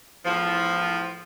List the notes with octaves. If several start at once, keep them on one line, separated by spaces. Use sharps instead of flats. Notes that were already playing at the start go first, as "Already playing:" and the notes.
E2 A2 F3